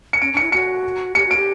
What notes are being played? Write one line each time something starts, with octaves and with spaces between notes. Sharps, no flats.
C#7
C#4 D7
D4 C#7
E4
F#4 C#7
G4 C#7
F#4 D7
G4